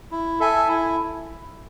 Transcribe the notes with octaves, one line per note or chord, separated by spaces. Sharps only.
E4
A4 E5 G#5
E4